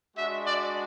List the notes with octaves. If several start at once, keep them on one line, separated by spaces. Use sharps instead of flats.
G#3 D4 F#4 E5
D5